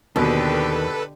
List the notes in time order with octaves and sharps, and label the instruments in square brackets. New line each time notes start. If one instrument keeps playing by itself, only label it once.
[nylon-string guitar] D#2 [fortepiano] B2 [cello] D3 G4 [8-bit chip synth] A4 B4